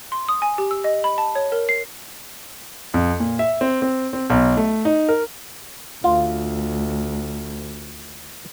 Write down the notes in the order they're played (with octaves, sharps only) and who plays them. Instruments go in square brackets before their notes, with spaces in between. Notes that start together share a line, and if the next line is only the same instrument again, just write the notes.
[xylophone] C6
D#6
G#5
G4
E6
D#5
B5
A5
C#5
A#4
C7
[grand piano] F2
A#2
E5
C4
C4
C4
B1
A3
D#4
A#4
[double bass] D2 [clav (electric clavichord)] F4